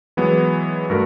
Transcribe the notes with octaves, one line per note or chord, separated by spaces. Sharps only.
E3 F#3 G#3 B3
G2 A3 F#4 A#4